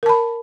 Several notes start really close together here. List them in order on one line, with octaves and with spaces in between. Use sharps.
A#4 A5 B5